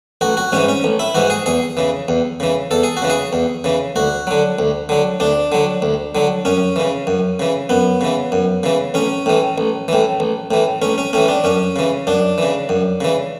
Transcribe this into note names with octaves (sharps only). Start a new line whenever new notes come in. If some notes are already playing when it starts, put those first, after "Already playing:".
A1 F#4
F#4
G#2 E3 C#4
C#4
A1
E4
G#2 E3 F#4
G#4
E2 G#4
C#3 E3
E2
C#3 E3
E2 A4
G#4
F#4
C#3 E3
G#4
E2
C#3 E3
D2 F#4
D3 F#3
D2
D3 F#3
D2 D4
D3 F#3
D2
D3 F#3
F#2 C#4
C#3 E3
F#2
C#3 E3
F#2 B3
C#3 E3
F#2
C#3 E3
A1 C#4
A2 E3
A1
A2 E3
A1
A2 E3
A1 C#4
C#4
A2 E3 C#4
D4
F#2 C#4
C#3 E3
F#2 D4
C#3 E3
F#2
C#3 E3